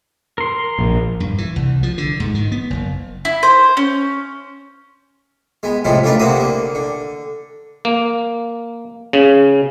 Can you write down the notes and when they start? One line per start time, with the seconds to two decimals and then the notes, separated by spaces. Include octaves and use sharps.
0.38 A#4 C6
0.79 A#1
1.20 G2
1.38 E3
1.56 C2
1.83 F3
1.98 D3
2.20 G#2
2.35 D#3
2.52 B3
2.70 F#1
3.25 E4
3.43 C5
3.77 C#4
5.63 G#3 B3
5.85 A2 C3 F3 G#3 A3
6.04 C#3 A3 D4 F4 A#4 B4
6.19 C3 A#3 C4 E4 F#4 D#6
6.36 D3 A#3
6.75 D3
7.85 A#3
9.13 C#3